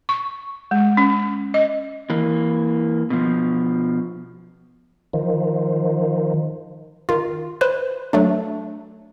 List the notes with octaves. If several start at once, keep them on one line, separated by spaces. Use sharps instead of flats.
C#6
G#3
C#4
D#5
E3 A#3
B2 F3
D#3 F3
D#3 F4
B4 C5
F#3 A3 D4